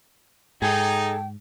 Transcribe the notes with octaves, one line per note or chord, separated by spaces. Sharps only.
G#2 D#4 G#4 A4 G5